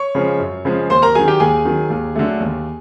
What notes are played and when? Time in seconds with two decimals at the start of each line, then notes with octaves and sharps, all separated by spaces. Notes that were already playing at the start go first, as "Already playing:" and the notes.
Already playing: C#5 C#6
0.15 C#3 F3 G#3
0.40 F#2
0.65 C#3 F3 G#3
0.90 D#2 C5 C6
1.02 A#4 A#5
1.15 D#3 F#3 G#4 G#5
1.28 G4 G5
1.40 D#2 G#4 G#5
1.65 D#3 F#3
1.90 D#2
2.16 D3 F#3 A3
2.40 D#2